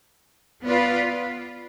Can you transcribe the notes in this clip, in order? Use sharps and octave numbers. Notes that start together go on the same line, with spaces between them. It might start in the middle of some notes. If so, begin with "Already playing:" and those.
B3 F4 B4 D5